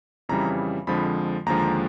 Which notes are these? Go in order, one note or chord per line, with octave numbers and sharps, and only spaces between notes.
F2 C#3 E3 G3 A#5
F2 D3 F3 G#3 B5
D#2 D3 F3 G#3 A#5